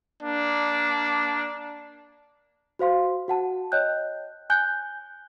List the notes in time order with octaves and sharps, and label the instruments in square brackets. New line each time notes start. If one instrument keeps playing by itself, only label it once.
[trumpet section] A#3 D4
[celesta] F#4 C5 F5 C6
F#4 F#5 A5
C#5 D#5 G5 F#6 G6
G#5 F#6 G6 G7